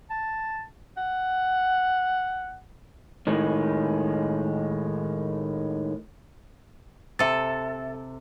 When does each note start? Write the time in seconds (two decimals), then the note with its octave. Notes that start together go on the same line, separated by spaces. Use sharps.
0.11 A5
0.97 F#5
3.27 A2 D#3 G#3
7.19 C3 A4 E5 A6